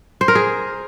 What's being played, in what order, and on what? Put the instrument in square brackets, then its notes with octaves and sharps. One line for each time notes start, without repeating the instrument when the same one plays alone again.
[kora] C5
A#4
G#4